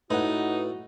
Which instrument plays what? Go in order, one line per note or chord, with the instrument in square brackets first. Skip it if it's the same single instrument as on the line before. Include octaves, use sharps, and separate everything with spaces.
[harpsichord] A2 [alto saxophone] D#4 [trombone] F#4 [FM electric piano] B4 F#5